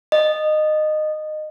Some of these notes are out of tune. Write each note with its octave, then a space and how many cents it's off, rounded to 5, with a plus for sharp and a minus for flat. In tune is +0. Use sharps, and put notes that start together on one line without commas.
D#5 -20